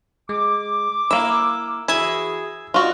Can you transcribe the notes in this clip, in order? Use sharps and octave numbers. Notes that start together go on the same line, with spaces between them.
G#3 D6
A#3 E4 E6
E3 E4 F#4 G#4 G#5 E6 G#6
D#4 F4 F#4 D5 D#5